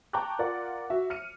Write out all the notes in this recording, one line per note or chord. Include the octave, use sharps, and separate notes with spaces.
G5 A5 A#5 C#6 D6 F#6
F4 A#4 D5 F#5
F#4 E5
F6 C#7 D#7